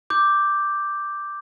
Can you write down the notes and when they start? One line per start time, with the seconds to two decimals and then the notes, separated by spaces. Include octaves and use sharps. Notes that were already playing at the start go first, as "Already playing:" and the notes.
0.10 D6 G6